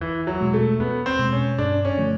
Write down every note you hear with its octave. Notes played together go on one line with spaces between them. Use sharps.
E2 E3
F#3
B2 G#3
A3
E2 B3
C4
B2 G#3
C#4
G2 D4
C#4
D3 F3 A3